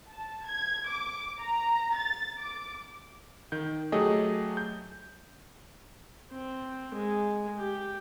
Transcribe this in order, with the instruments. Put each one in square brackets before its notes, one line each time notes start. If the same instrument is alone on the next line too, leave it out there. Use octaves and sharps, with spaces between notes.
[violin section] A5
G#6
D6
A#5
A6
D6
[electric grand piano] D#3 G6
F#3 A3 G4 G#4 D#5
G6
[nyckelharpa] C4
G#3
G4